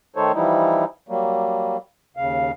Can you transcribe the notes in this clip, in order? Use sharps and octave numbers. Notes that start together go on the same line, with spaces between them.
D#3 A3 D#4 A4 C5 C#5
E3 F3 G3 D#4 E4
F#3 G3 A#3
D#2 C#3 F5